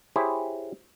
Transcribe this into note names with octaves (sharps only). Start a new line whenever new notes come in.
E4 G4 G#4 C5 C#5